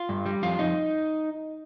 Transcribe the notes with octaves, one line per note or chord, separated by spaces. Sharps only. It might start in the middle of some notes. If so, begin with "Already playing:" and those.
Already playing: F4
G2
G3
F2 F4
F2 D#4